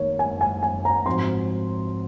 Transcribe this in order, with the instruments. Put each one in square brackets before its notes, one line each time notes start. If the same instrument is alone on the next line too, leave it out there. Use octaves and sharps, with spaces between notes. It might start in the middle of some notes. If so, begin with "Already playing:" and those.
Already playing: [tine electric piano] D#3 A#3 D#4 A#4 [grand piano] C#5
[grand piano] G#5
G#5
G#5
A#5
[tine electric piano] G#2 F3 C4 F#4 C5 [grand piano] C6